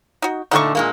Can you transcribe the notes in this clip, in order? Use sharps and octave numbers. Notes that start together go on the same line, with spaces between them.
D#4 F#4
A#2 D3 A3 D#4 F#5 C#6
A#2 G#3 A#3